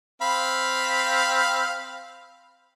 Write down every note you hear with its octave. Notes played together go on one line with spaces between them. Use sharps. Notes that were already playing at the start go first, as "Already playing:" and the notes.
C4 F5 B5